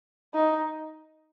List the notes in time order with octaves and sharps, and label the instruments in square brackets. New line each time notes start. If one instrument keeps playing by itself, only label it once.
[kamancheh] D#4